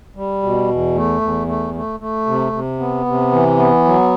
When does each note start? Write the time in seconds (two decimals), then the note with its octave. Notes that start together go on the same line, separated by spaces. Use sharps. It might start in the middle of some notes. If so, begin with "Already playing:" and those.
0.16 G3
0.43 B2
0.68 E2
0.96 A3
1.21 E2
1.48 A3
1.74 A3
2.00 A3
2.26 C3
2.53 C3
2.79 B3
3.06 C3
3.32 E3
3.58 B3
3.85 F#3